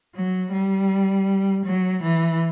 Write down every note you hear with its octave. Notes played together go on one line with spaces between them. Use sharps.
F#3
G3
F#3
E3